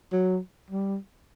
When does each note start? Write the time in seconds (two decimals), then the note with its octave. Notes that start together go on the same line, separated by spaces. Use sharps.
0.12 F#3
0.70 G3